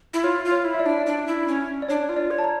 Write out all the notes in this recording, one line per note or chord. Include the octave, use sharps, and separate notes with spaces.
E4
F4 C#5
F4
C#5
E4
E5
D5
D4
D4
E4
C#4
D5
D4 C#5
F4
D5
C#5
A5
A#5